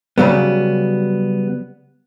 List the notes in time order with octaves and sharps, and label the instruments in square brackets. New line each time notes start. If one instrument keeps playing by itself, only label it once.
[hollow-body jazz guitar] C#3 F#3 G3 B3